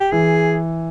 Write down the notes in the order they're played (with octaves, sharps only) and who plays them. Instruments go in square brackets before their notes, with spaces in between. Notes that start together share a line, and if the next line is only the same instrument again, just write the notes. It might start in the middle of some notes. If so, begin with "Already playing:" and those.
[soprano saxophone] G4
[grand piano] E3 [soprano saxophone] G#4